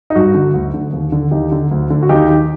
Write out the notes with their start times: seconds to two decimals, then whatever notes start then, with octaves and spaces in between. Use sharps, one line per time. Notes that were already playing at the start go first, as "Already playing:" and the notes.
0.10 D#4
0.15 G2 F#4
0.34 D3
0.54 D2
0.74 D3
0.93 D#2
1.12 D3
1.31 D#2 D#4 G4
1.52 D3
1.71 D2
1.90 D3
2.03 F#4
2.09 D#2 D#4 G4
2.29 D#3